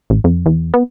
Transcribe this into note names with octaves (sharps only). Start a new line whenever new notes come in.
A1
F2
E2
B3